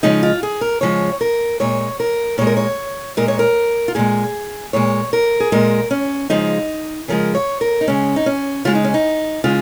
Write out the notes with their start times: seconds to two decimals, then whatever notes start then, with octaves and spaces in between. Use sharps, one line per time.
0.03 C#3 F3 G#3 D#4
0.23 F4
0.43 G#4
0.61 A#4
0.81 C#3 F3 G#3 C#5
1.21 A#4
1.60 A#2 G#3 C#5
2.00 A#4
2.38 A#2 G#3 C#5
2.47 A#4
2.57 C#5
3.17 A#2 G#3 A#4
3.28 C#5
3.39 A#4
3.88 F4
3.95 A#2 G#3 G#4
4.73 A#2 G#3 C#5
5.13 A#4
5.40 G#4
5.52 A#2 G#3 A#4
5.91 C#4
6.30 C#3 F3 G#3 D#4
7.08 C#3 F3 G#3 A#4
7.35 C#5
7.61 A#4
7.81 D#4
7.87 C#3 G#3 C#4
8.16 D#4
8.26 C#4
8.65 C#3 G#3 F4
8.75 D#4
8.84 C#4
8.94 D#4
9.44 C#3 G#3 F4